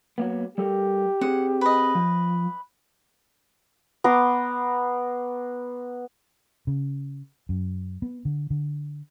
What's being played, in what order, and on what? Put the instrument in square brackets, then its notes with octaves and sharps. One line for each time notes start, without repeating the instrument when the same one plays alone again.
[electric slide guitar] F#3 A#3 B3
[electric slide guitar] G3 A4 A#4 [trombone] G4
[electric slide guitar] C4 G#4 [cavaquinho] F#5
[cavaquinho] B4 D#5
[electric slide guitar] F3
[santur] B3 A#5 C6 D6
[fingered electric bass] C#3
F#2
B3
D3
D3